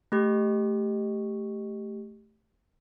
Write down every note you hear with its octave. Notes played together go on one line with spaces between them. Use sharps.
A3 G4